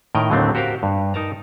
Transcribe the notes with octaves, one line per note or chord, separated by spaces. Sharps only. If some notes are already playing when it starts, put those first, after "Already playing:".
A2 D#3 A#4 D#5 G5
D#2 A2 D3 F#3 A3 C4
F#4 G4 A#4 C5 F5
G2
D#4 A#4 A5 A#5